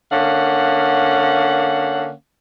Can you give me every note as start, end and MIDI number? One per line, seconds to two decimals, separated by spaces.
0.12 2.11 50
0.12 2.11 58
0.12 2.11 61
0.12 2.11 77
0.12 2.11 78